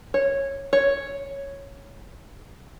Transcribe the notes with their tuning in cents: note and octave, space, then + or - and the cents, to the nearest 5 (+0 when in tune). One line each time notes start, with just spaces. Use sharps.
C#5 -10
C#5 +0